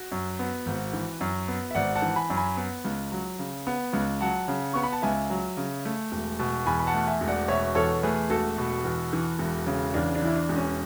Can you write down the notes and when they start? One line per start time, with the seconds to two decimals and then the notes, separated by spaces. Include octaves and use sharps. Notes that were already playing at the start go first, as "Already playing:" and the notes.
Already playing: F#4
0.12 F#2
0.39 B3
0.66 G#1
0.93 E3
1.21 F#2
1.48 B3
1.71 E5
1.75 G#1 D5 F#5
1.95 F#5 A5
2.02 E3
2.16 G#5 B5
2.30 F#2
2.37 G#5 B5
2.57 B3
2.84 C#2
3.12 F#3
3.39 C#3
3.67 B3
3.93 C#2
4.21 F#3 F#5 A5
4.48 C#3
4.73 B3 C#6
4.83 B5
4.93 A5
5.02 C#2 E5 G#5
5.30 F#3
5.57 C#3
5.85 A3
6.12 E1
6.39 B2
6.66 E2 G#5 B5
6.79 B5
6.87 F#5 A5
6.94 A3
7.07 E5 G#5
7.21 E1
7.27 D5 F#5
7.48 B2 C#5 E5
7.75 E2 A4 C#5
8.03 A3 G#4 B4
8.30 E1 F#4 A4
8.58 B2
8.84 E2
9.13 E3
9.39 E1
9.67 C#3
9.94 E2 D4
10.15 D4
10.22 E3 E4
10.36 D4
10.49 E1
10.56 C#4